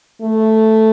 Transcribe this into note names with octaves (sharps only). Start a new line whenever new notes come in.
A3